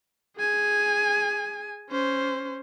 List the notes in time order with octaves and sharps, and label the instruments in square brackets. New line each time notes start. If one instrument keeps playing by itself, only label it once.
[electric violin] G#4 G#5
C#4 C5